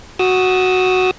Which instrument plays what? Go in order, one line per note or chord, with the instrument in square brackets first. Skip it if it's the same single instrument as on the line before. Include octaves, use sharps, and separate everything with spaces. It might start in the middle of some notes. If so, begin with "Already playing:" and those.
[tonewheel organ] F#4 D#6 E6